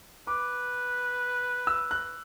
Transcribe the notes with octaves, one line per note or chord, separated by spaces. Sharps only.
B4 D6
E6
F#6